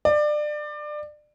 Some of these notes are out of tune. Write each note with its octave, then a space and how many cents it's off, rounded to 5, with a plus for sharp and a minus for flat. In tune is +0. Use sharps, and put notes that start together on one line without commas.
D5 +25